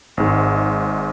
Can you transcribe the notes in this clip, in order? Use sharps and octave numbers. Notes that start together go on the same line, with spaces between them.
G#1 G#2